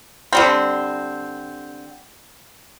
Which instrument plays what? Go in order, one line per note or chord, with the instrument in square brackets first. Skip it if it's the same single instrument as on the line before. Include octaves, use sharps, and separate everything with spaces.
[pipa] D3 G3 C4